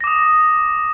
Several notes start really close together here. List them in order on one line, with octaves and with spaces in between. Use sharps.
A#6 D6 D#6